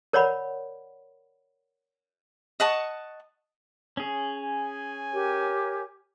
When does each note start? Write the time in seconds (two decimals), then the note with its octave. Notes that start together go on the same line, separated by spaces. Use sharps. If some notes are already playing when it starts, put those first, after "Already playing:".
0.13 A#4 C#5 D5 F#5 B5
2.60 D#5 F#5 A5 C#6
3.97 C#4 G#4
4.37 G#5
5.12 G4 A#4 C#5